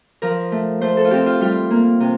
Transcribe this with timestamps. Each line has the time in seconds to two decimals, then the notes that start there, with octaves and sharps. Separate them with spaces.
0.22 F3 A#4
0.52 A3
0.81 A3 C5
0.97 A4
1.05 F4
1.11 C4 G4
1.26 F4
1.41 G3 F4
1.70 A#3
2.00 C3